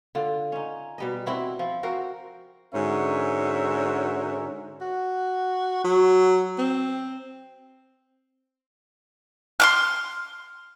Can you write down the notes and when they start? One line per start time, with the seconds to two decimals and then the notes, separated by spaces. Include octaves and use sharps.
0.15 D3 F4
0.52 C#4 D#4
0.98 B2 G3 D#5
1.26 C4 E4 F#4
1.59 F3
1.83 C4 F#4 A#4 C5
2.74 G#2 D3 C#4 F#4 A#4 E5
4.81 F#4
5.84 F#3
6.58 C4
9.60 C6 D6 F6